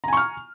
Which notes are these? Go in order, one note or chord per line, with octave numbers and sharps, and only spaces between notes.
G#5 A#5 C#6 F6